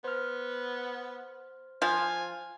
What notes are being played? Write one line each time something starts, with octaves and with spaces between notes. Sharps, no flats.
B3 C5 F6
F3 F4 G#5